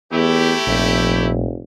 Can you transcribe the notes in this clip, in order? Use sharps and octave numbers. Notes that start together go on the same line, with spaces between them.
E2 A3 E4 G4
F1 A#1